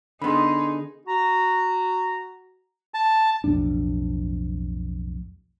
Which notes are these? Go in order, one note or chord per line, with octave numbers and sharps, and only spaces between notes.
D3 B3 D#4 G#4 B5 C6
F#4 A#5
A5
B1 F2 A2 D4